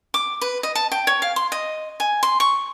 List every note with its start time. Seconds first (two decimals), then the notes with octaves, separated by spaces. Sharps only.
0.14 D6
0.41 B4
0.63 D#5
0.75 A5
0.92 G5
1.07 C#5
1.22 F5
1.36 C6
1.52 D#5
2.00 G#5
2.23 C6
2.40 C#6